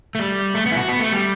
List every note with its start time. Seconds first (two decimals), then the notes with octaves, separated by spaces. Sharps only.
0.15 A3
0.19 G3
0.54 A3
0.66 B3
0.72 E4
0.77 F#4
0.89 B3
1.00 A3
1.12 G3